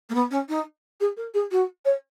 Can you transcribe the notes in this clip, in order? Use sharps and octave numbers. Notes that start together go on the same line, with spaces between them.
A#3
B3
C#4
D#4
G#4
A#4
G#4
F#4
C#5